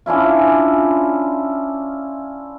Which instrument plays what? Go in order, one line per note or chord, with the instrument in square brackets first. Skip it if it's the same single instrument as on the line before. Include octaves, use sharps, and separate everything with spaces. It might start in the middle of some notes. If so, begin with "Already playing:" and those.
[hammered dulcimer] C#4 D4 E4 F4